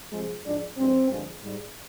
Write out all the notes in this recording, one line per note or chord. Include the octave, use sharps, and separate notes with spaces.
C3 F3 G#3
G#2 F3 G#3 D4
G2 F3 G#3 C4
G2 D3 F3 G#3
G#2 G3